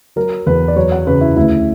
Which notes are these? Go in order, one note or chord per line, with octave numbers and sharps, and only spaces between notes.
F#3 A#4
E2 B4
D5
F#3 C#5
F#5
C#3 B4
E4
D2 E4